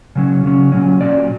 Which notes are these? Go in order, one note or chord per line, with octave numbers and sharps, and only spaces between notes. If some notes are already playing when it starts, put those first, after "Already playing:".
C#3 F#3 C#4
C#3 F#3 C#4
A#2 F#3 C#4
A#2 F#3 C#4 D5